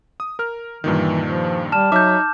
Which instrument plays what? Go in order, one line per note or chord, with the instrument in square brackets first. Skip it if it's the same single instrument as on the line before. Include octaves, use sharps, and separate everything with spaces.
[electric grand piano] D#6
A#4 F6
[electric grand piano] G2 A#2 D#3 [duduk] E3
[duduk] F3
[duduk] G3 [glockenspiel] A5 F6 E7
[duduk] F#3 [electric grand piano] D#4 E5 [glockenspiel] D6 G6